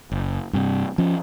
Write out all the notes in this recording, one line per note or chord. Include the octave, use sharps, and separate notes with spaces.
F#1
G2 C3
F3 C#4